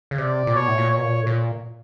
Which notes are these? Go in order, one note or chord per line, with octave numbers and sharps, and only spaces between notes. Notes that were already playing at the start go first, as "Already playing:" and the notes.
C#3
C3 D5
A#2
B2 C#5
A2
A#2
C#5
B2
A#2
A2
A#2